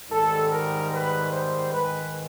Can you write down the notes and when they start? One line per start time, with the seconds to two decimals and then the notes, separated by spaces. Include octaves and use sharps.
0.11 G#2 D#3 G3 A4
0.52 A#4
0.92 B4
1.32 C5
1.72 G#2 D#3 G#3 B4